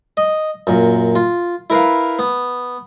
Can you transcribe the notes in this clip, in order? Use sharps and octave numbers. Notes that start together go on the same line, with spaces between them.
D#5
F#2 A#2
F4
E4 A#4 B4 F5
B3